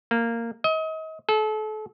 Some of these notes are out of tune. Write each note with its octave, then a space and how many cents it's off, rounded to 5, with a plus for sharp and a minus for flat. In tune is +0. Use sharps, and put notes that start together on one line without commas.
A#3 -10
D#5 +35
A4 -35